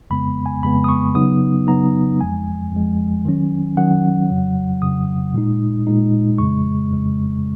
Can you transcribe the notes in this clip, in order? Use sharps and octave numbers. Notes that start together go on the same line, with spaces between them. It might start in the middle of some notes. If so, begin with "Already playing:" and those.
F2 C#3 G#3 B3 B5
G#5
F2 C#3 G#3 B3 B5
D#6
C#6
C#3 F#3 B3 D#4 D#6
C#3 F#3 B3 D#4 A#5
F2 F3 G#3 G#5
F2 F3 G#3
D#3 F#3 C#4
D#3 F#3 C#4 F#5
F2 C#3 F#3
F2 C#3 F#3 D#6
A#2 G#3 D#4
A#2 G#3 D#4
F2 C#3 G#3 C#6
F2 C#3 G#3